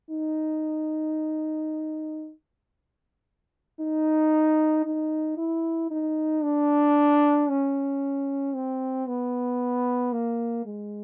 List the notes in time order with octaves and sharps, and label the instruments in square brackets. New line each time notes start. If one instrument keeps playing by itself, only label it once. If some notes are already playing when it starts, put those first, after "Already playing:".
[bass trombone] D#4
D#4
D#4
E4
D#4
D4
C#4
C4
B3
A#3
G#3